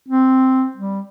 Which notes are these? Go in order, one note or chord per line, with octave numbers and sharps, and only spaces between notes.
C4
G3